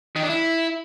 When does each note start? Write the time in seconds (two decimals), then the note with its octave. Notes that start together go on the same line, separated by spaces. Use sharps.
0.16 D#3
0.23 D4
0.30 E4